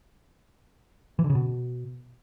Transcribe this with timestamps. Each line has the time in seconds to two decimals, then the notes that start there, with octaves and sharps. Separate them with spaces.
1.19 E3
1.24 D3
1.30 C#3
1.35 B2